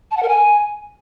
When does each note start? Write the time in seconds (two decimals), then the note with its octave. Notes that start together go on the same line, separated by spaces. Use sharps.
0.11 A5
0.17 F#5
0.23 A#4
0.28 G#5